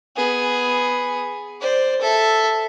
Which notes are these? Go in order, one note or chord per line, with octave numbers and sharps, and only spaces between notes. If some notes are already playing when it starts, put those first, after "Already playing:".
B3 G#4
C5 D5
A4 E5